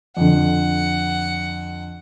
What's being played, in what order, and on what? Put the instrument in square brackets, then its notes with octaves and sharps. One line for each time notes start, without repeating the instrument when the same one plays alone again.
[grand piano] F2 D3 [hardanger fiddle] F#5